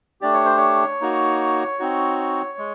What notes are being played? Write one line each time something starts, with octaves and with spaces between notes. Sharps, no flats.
A3 D4 G4 D5
C#5
C5
C#5
A#3 D#4 F#4
C4 D#4 F#4
G#3